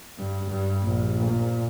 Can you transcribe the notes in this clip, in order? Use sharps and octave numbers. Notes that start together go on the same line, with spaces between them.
G2
G2
A#1
A#2